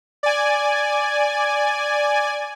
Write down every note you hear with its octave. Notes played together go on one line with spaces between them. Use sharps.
D5 G#5